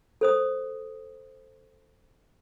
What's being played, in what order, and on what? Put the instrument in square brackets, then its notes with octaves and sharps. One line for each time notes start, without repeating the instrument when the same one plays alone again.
[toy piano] A4 C5 D#6